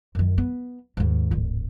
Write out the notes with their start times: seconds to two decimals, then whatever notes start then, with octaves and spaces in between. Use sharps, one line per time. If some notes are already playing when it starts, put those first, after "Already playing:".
0.15 F#2 D#3
0.38 B3
0.97 D#2 G#2
1.31 D1 G#1